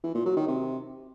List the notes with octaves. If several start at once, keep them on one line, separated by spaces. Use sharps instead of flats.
E3
A#2
F#3
D#3
C3